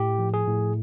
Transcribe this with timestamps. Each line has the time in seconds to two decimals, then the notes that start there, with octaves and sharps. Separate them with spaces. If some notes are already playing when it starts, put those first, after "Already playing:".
Already playing: A2 G4
0.19 F3
0.34 G#4
0.47 A2